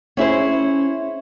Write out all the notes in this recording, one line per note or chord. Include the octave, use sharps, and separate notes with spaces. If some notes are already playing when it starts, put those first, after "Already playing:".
C#4 E4 G#4 C5